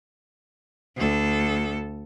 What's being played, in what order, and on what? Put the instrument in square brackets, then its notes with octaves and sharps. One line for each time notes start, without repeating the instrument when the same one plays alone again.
[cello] D2 A4